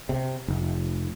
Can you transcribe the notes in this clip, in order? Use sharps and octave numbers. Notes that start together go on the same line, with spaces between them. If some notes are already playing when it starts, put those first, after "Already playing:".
C3
F1